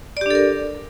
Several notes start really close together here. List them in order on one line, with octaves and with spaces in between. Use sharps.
D5 G4 D4 A4 A#4